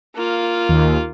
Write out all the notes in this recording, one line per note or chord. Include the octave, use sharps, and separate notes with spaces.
A#3 F4
D#2